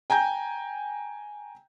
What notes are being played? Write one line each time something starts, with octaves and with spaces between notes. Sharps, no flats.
G5 G#5 A#5 G6